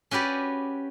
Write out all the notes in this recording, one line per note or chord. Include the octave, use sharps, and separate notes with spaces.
C#4 F#4 G4 B4 D5